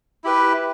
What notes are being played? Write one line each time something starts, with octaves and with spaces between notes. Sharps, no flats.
E4 G4 B4